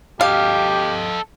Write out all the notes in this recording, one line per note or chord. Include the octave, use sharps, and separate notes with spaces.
G4 A4 D#5 F5